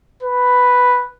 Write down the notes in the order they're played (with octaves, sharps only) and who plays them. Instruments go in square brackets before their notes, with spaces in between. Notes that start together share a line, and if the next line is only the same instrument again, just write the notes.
[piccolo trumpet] B4